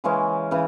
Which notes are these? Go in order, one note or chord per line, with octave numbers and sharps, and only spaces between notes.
C#3 E3 G#3 C#4
C#3 E3